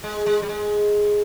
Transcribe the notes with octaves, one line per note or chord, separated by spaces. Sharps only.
G#3
G#3
G3
G#3